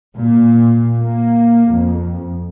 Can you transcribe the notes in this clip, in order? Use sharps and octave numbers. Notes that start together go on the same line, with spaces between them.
A#2
A#3
F2